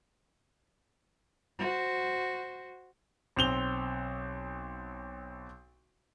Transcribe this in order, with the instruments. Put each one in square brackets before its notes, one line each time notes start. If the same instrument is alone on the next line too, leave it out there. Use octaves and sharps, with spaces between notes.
[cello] F#4 C5
[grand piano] B1 C4 F7 G7